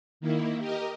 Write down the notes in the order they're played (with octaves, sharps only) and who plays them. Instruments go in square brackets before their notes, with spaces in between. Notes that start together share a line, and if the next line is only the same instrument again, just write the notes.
[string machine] D#3 A#3 E4
G4 A#4 D#5